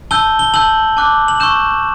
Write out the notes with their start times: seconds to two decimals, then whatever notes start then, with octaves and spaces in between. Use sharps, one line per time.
0.11 A5 E6 G6 G7
0.39 G7
0.54 A5 E6 G6 F#7
0.97 A5 D6 F#6
1.28 F#7
1.40 C#6 E6 G6 E7